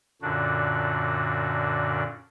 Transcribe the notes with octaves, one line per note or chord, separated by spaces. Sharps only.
F#2 A#2 D3 D4 F#4